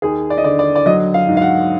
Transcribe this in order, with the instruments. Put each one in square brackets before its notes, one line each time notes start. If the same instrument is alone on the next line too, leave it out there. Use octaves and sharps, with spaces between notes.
[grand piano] D#2 G#4
D5
D#5
D3 D5
D5
D5
F#3 D#5
F5
G#2
F5
F#5